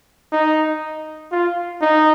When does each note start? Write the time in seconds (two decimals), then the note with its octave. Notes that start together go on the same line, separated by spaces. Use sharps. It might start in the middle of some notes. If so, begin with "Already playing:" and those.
0.32 D#4
1.32 F4
1.81 D#4